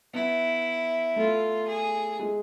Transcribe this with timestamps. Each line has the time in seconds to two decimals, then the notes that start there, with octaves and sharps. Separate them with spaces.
0.14 B3 E4
1.16 A3 F4
1.67 G#4
2.19 G#3